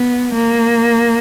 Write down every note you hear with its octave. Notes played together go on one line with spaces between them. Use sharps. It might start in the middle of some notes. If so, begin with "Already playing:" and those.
Already playing: B3
A#3